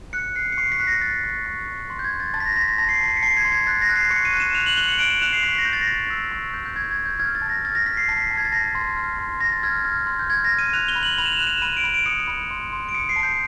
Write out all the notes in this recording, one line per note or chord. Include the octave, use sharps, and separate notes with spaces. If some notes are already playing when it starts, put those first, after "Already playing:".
F#6 C#7
F#6 C7
C#7
C#6 C7
B6
F#6
A#6
F#6 A6
C#6
C#6
C#6
C6
G6
G#6
C6
A6
A5 A6
B6
A#6
B6
C6 A#6
A#6
A5 A#6
C7
B6
A5
B6
C#7
A5 C7
G#6
C6
G#6
F#6 A6
A#6
F#6
C7
C#6 C#7
D#7
F#6
E7
F#6 F7
F#7
F#6 G7
C#7
F#6 D7
E7
F#6 F7
C7
C#6 B6
A#6
G6
A6
A#6
C#6 A6
E6
C#6
G6
G6
C#6 G#6
G#6
C#6
G6
F6 G#6
A6
A5
A#6
F6 A6
A#6
F6 B6
C7
A5 B6
A5
G#6
A6
A5 A#6
C6
F6
C6
C6 A#6
A6
F6 G#6
F6
C6
G6
F6 G#6
A#6
F6
D#7
F#6 F7
G7
B5
F#7
B5 F7
E7
F7
F#6
E7
B5 D#7
D7
B5
D7
D#6 C#7
B5
C6
C6
D7
D#6 C#7
C7
A5
G6